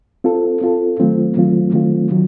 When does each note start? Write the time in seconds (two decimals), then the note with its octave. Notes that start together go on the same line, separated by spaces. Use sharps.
0.24 C4 F4 A4
0.61 C4 F4 A4
1.00 D#3 F#3 A3 C4 F4
1.37 D#3 F#3 A3 C4 F4
1.73 D#3 F#3 A3 C4 F4
2.11 D#3 F#3